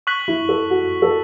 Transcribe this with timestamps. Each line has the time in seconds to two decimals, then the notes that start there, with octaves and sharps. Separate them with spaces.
0.07 C#6 F#6 B6 F#7
0.28 E4
0.49 A4
0.70 F#4
1.02 A4